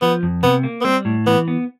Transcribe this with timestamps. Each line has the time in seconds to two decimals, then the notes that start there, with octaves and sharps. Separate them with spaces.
0.02 F3 B3
0.23 F2
0.43 C3 B3
0.64 A#3
0.81 B3
0.85 G3 C4
1.05 A2
1.27 E3 B3
1.48 B3